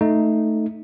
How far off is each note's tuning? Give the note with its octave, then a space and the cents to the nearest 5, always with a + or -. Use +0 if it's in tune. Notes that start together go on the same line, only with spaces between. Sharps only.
A3 +0 D#4 +0